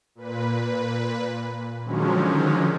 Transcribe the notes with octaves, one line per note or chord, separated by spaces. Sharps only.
A#2 B4
D3 D#3 F3 F#3 G#3 C#4